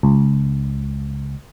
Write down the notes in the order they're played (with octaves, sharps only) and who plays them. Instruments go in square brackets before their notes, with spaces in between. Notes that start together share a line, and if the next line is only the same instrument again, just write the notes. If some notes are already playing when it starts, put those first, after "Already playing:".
[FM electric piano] C#2